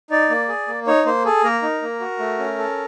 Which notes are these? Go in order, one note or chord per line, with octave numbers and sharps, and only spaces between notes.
D#4 D5
A#3
G#4
A#3
D#4 C#5
A#3 C5
G#4 A4
A#3 A#4
D#4
A#3
F#4
A3
C#4
A4